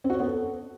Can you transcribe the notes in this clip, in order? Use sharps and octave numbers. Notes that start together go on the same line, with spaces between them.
C4
F#4
C#5
B3
A4